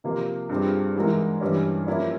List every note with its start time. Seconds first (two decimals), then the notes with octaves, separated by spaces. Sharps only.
0.04 C3 F3 A#3 F4
0.49 G2 G3 C4 F4 G#4
0.96 G#2 E3 G#3 E4 A#4
1.41 G2 E3 G3 C#4
1.87 F3 A#3 C#4 E4